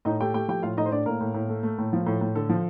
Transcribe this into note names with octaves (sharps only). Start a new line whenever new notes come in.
A2 D#4 D#5
A3 G4 G5
A3 G4 G5
F3 G4 G5
A2 F4 F5
A2 D#4 D#5
C5
A2 D4 D5
A2 A#3 A#4
A2
A2
A3
A3
A2
F3
A2
A2
D3 A4
F3